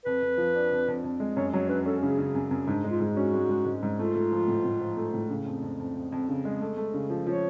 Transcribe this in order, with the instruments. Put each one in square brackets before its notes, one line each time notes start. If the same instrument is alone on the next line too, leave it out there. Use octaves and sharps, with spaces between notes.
[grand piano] F2 [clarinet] B4
[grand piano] F2
F3
D4
F2
F2
F2
G#3
[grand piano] F#2 [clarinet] C#5
[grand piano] F#3 [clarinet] C#5
[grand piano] C#4 [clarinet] B4
[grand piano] C#4 [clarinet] A4
[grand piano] C#3 [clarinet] G#4
[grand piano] C#3
F#2
F#2
[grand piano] G#2 [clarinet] D4
[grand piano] G#3 [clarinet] F4
[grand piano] G#2
[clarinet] F#4
[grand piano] C#4
G#3
G#3
G#2
G#2
[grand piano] A3 [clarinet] F4
[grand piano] A3
F3
A2
A2
F3
A3
A2
C#3
F2
F2
F2
F2
F2
C#3
G#3
A3
A3
C#3
F3
[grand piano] F3 [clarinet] C#5